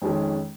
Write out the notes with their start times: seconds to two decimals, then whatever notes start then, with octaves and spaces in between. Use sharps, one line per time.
0.02 F2 D#3 G#3 C#4